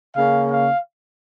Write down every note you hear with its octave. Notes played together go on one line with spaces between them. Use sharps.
C#3 A#3 C#4 F5
F5